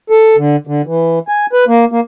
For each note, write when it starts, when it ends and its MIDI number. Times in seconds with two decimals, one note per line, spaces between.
0.10 0.36 69
0.37 0.56 50
0.67 0.82 50
0.87 1.19 52
1.28 1.46 80
1.53 1.65 71
1.67 1.85 58
1.92 2.00 58